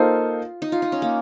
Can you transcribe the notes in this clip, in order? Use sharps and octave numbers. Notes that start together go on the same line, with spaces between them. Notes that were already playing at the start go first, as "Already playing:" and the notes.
Already playing: A#3 D#4 F4 A4 C5
D#4
F4
D#4
C#4
A#3